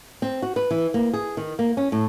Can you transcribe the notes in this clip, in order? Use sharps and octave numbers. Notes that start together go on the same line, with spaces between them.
C4
F#4
B4
E3
A#3
G#4
D#3
A#3
C#4
A2